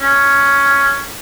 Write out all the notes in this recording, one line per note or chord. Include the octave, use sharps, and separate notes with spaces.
C#4